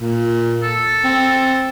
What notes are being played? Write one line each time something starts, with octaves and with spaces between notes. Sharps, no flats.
A#2
A4
C4